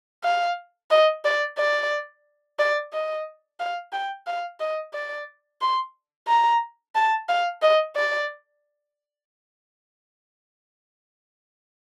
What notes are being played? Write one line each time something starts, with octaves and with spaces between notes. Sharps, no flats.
F5
D#5
D5
D5
D5
D#5
F5
G5
F5
D#5
D5
C6
A#5
A5
F5
D#5
D5